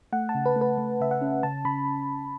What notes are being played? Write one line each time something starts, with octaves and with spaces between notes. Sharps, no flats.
A3 F#5
A5
C#3
B4
A3
B4
A3
C#3 E5
F#5
C#4
C#3 A5
C#3 B5